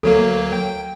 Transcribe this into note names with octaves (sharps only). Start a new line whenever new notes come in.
D2 F#3 A#3 A4
G5